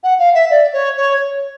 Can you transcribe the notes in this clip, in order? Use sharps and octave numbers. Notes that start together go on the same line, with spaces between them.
F#5
F5
E5
D5
C#5
C#5